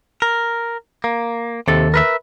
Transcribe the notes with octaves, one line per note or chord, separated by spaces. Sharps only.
A#4
A#3
D#2 C3 A4
A#4 B4 E5